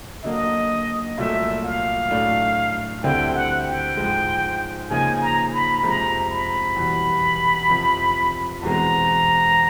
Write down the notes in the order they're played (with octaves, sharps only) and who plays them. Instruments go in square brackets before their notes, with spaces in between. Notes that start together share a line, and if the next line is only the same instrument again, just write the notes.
[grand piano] D3 F#3 A#3 [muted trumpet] D#5
[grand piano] C2 A#2 F#3 A3 [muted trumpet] E5
[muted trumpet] F5
[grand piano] A2 F#3 A3 D4
[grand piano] D2 D3 G3 C4 E4 [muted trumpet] G5
[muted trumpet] F#5
G5
[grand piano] G#2 F3 G#3
[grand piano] C#3 F3 A#3 D#4 [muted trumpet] G#5
[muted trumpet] A#5
B5
[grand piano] F2 C3 F3 G#3 [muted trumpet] A#5
[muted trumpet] B5
[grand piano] E2 B2 G3
F2 C3 F3
[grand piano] E2 B2 G#3 C4 [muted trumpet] A#5